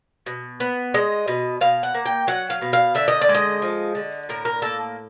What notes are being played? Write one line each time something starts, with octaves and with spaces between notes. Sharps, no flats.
B2
B3
G#3 D#5
B2
B2 F5
F#5
A#3
G5
F#3 F#5
F5
B2
F5
D3 E5
D#5
D5
G#3
D#5
F3
D3
A2 A#4
A#4
A#3 A4